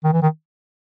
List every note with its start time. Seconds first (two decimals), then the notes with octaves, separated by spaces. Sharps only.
0.04 D#3
0.13 E3
0.22 D#3